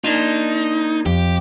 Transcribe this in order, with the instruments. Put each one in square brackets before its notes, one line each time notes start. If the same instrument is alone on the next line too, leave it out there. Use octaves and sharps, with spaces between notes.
[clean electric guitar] A#3 D4 F4 [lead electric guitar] D#4
[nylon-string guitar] F2 [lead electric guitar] G4